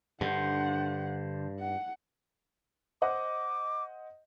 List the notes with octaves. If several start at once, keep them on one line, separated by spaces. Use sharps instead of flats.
G2 D3 C5 F#5
F#5
C5 D#5 F#5 D6